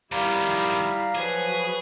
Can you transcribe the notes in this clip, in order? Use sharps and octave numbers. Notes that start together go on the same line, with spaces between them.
F2 D#3 G3 E4 G4 F5 A#5 B5
F3 F#3 G#4 B4